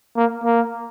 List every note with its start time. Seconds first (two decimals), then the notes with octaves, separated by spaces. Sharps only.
0.17 A#3
0.44 A#3